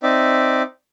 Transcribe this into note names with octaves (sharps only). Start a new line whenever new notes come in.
C4 D#4 D5 E5